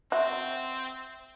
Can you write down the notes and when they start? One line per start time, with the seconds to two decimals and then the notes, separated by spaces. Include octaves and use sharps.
0.12 C4 F#4 E5 C6